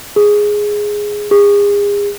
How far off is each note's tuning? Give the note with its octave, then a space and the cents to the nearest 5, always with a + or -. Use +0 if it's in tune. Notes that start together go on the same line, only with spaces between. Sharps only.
G#4 +0
G#4 -35